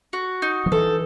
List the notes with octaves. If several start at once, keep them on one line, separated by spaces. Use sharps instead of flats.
F#4
D#4
F3
E3 A4